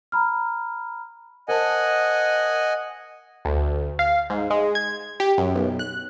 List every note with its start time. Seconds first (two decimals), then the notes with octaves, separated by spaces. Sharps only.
0.12 A#5 B5 F6
1.48 A#4 C5 D#5 F#5 G#5 A5
3.45 D2
3.99 F5
4.30 G#2
4.50 G#3
4.75 G#6
5.20 G4
5.38 F#2
5.55 B1
5.79 F#6